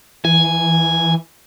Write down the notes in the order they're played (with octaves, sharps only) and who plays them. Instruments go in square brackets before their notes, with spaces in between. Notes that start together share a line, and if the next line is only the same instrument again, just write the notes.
[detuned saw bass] E3 [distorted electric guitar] G#5